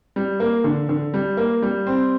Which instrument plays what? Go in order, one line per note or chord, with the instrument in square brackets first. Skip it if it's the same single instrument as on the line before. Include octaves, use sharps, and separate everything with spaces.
[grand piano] G3
A#3
D3
D3
G3
A#3
G3
C4